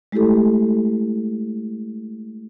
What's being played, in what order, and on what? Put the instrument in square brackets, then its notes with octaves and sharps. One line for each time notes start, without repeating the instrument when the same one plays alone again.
[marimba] G#3 A3 E4 G4 A4